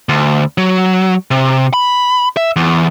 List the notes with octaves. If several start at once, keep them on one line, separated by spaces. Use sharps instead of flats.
D2
F#3
C3
B5
E5
E2